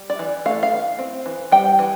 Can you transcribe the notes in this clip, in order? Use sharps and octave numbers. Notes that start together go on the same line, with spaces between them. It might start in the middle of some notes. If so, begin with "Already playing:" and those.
Already playing: G3
D5
E3
A3 F5
F5
E3
C4
E3
G3 G5
E3